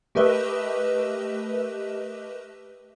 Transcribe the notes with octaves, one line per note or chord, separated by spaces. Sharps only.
A3 G4 A#4 B4 D#5 E5